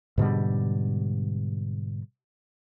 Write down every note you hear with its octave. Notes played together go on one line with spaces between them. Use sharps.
G#2 B2 D3 G3